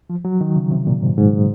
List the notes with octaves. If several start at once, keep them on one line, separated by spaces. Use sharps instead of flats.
F3
F#3
D#3
C#3
C3
A#2
G#2
G#2